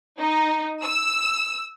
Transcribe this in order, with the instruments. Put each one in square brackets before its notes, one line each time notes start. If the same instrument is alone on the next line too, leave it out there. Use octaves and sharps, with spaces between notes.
[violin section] D#4
E6